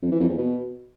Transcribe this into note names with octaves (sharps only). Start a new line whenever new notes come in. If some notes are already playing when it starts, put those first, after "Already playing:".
F2
E3
F2
E2
B2